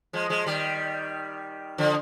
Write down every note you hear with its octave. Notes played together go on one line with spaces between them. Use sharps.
F3 G#3
F3 G#3
D#3 G3
D3 F3